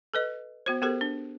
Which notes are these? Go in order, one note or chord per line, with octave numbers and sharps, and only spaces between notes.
A4 B4 D#5
B3 F#4 C5
B3 G4 A4 A#4 C5
D4